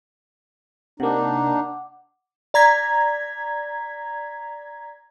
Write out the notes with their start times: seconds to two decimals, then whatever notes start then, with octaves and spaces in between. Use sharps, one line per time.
1.00 C3 A#3 D4 D#4 F#5 D6
2.54 D5 A#5 G#6 B6